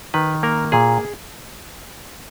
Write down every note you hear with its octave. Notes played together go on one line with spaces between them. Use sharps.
D#3 B4
A#3 A#4
A#2 G#4